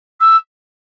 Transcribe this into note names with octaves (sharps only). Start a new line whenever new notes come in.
E6